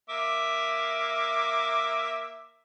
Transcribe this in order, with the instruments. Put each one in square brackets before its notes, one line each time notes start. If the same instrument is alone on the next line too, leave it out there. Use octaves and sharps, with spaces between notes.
[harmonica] A#3 E5 D6